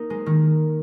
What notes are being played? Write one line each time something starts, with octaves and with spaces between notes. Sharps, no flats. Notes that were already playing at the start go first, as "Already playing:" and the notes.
Already playing: A#3 D#4 A#4
G#3
D#3